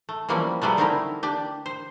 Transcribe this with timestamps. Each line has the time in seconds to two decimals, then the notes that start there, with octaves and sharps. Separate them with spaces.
0.09 A3
0.29 E3 F3 G3 A#3 C4 C#4
0.62 C#3 F#3 G3 A3 B3
0.77 D3 A3 C4 D#4 E4 A#4
1.23 D4 G4
1.66 C5